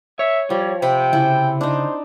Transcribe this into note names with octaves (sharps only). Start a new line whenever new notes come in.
C#5 E5
F3 G3
C3 C4 G5 B5
C#3 E4
D4 D#4 C5